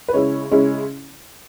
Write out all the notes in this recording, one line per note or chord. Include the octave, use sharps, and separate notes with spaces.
B4
C#3 G#3 C#4 E4 C#5
C#3 G#3 C#4 E4